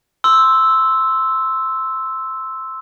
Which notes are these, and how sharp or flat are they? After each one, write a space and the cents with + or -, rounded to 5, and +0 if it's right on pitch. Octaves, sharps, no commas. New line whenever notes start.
C6 +0 E6 -5